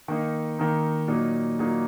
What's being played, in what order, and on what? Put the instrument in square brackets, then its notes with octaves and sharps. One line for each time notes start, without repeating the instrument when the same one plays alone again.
[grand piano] D#3 A#3 D#4
D#3 A#3 D#4
A#2 F#3 A#3 D#4
A#2 F#3 A#3 D#4